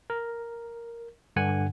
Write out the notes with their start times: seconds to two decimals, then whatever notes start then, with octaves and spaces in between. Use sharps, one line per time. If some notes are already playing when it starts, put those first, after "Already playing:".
0.10 A#4
1.36 G2 D3 F#5 G#5